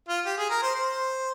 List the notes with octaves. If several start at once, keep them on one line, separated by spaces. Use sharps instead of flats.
F4
G4
G#4
A#4
C5
C5